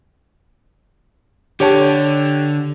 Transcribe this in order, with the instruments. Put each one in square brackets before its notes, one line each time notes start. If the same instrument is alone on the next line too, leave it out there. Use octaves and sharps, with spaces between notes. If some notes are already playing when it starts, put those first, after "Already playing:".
[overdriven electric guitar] D3 [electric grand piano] G4 C#5 A5